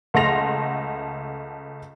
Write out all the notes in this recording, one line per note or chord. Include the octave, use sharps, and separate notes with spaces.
C#2 A3 F#5 C6 A#6 F7